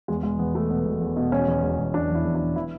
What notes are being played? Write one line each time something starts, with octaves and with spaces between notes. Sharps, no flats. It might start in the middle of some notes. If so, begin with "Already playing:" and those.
E2 G#3
E1 G#3
E2 B3
B2 A3
B2 B3
E1
E2
B2
E1 C#4
E2
E1
E1
E1 D4
E2
E4
E2
D4
E1
E3 E4